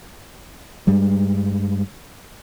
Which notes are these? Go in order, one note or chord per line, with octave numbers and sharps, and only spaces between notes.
G2 G3 G#3